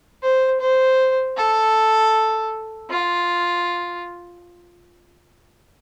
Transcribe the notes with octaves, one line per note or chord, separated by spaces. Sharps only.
C5
C5
A4
F4